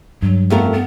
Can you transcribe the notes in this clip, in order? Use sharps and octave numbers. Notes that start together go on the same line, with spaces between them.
G2 F#3
F2 A3 B3 A#4
B3